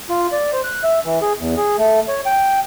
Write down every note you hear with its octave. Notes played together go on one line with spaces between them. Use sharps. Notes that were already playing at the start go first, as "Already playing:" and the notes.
F4
D5
C5
F#6
E5
E3
G#4
E2
G#4
A3
C#5
G5